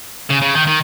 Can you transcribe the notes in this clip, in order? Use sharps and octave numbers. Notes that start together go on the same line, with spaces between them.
C#3
C#3
D#3
D#3